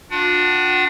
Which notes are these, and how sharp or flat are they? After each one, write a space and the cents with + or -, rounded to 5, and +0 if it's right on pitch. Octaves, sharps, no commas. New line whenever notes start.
D4 +0 F4 +45 F#5 +35